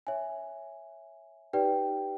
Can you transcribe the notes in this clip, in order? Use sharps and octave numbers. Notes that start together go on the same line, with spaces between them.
C#5 E5 G#5
D#4 G4 B4 D5 G5